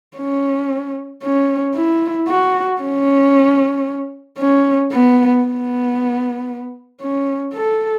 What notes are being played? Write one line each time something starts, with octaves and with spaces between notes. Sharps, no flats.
C#4
C#4
E4
F#4
C#4
C#4
B3
B3
C#4
A4